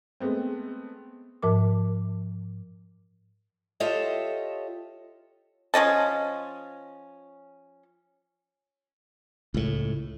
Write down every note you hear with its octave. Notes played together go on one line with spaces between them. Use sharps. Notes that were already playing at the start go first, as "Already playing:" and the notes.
G#3 A3 B3 C4
G#2 F3 A#4 D6
F4 G4 A4 C#5 D#5 E5
F3 C#4 D#5 A5
C#2 A2